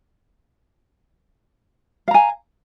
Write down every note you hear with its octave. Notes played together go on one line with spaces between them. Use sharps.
F5 G#5 A#5